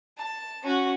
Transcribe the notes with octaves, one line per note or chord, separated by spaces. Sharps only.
A5
C#4 F#4